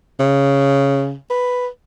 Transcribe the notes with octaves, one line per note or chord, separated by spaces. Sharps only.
C#3
B4